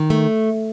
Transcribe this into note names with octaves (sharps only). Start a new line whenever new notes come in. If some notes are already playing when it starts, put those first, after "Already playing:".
Already playing: D#3
A3